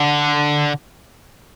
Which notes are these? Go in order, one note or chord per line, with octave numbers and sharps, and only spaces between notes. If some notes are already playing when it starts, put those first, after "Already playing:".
Already playing: D3